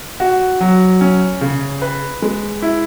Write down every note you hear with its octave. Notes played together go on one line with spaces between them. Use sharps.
F#4
F#3
C#4
C#3
B4
G#3
E4